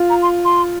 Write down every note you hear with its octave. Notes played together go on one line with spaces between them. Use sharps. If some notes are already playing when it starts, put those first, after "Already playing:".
Already playing: F4
A#5
C6
C6